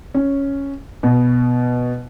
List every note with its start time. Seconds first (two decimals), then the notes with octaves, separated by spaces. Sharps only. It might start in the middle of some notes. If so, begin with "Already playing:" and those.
0.14 C#4
1.03 B2